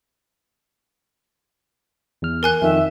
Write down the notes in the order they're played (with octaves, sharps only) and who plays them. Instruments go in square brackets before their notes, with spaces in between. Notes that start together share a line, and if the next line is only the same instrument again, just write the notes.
[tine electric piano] E2 F6
[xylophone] A#4 G#5 F#6
[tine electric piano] F2 D#3 [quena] E5